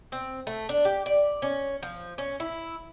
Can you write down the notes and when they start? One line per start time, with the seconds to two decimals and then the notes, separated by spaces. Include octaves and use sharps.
0.12 C4
0.47 A3
0.69 D4
0.85 G4
1.06 D5
1.42 C#4
1.83 F3
2.18 C#4
2.40 E4